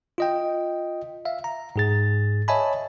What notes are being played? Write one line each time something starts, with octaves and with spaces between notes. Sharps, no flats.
F4 D#5 G5
E5 F5
A#5
G#2 G#4 A6
C#5 D#5 E5 G#5 A5 B5